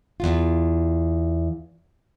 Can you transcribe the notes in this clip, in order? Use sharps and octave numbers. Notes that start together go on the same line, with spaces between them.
E2 G2 F4